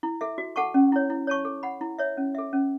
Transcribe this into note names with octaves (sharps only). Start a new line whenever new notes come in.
E4
A4 E5
F#4
A4 F#5 A5 C#6
C#4
E4 C#5
E4
C#5 A5 C#6
A4
F#5 B5
E4
C#5 E5
C#4
A4 E5
C#4